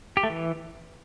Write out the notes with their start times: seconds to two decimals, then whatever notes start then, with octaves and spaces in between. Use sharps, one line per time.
0.17 G4
0.23 A3
0.30 E3